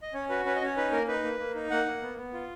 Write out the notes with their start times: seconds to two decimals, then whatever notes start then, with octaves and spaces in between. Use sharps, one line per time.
0.02 D#5
0.14 C#4 C#5
0.30 F#4 B4
0.45 C#4 B4
0.56 D#5
0.61 C#4 C#5
0.77 D#4 B4
0.92 A#3 A#4
1.08 D#4 B4
1.24 A#3
1.39 A#3
1.55 D#4
1.70 A#3 F#5
1.86 A#3
2.02 B3
2.17 B3
2.34 F4